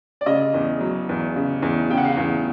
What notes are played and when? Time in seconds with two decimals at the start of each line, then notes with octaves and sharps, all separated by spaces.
0.21 D5
0.26 C#3 D#5
0.54 E2
0.81 F#3
1.09 E2
1.36 C#3
1.62 E2
1.90 C#3 G5
1.98 F#5
2.05 F5
2.12 E2 F#5